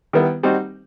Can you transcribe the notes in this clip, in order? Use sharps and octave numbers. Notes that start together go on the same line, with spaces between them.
D#3 G3 B3 E4
G3 C4 D#4 F#4